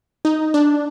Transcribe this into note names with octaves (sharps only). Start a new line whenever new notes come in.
D#4
D4